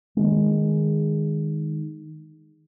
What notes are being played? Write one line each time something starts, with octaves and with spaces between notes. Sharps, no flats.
D#3 G#3